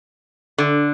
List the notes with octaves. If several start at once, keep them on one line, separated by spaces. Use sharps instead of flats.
D3